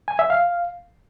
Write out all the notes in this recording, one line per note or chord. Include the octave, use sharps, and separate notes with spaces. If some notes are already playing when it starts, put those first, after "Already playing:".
G#5
E5
F5